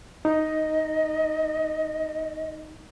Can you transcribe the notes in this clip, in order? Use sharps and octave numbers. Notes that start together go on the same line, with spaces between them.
D#4 D#5